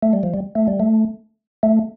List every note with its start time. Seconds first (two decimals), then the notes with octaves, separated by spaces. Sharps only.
0.03 A3
0.13 G3
0.23 F3
0.34 G3
0.55 A3
0.68 G3
0.80 A3
1.63 A3